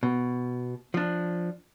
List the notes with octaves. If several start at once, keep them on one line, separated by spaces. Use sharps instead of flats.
B2
F3 D4